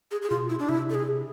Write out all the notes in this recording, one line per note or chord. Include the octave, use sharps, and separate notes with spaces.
G#4
G#4
B2 F4
E4
D4
C3 E4
A4
G#4